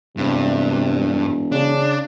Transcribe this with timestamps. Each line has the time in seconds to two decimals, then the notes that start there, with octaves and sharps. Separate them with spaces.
0.17 E1 G2 C3
1.52 C#3 D4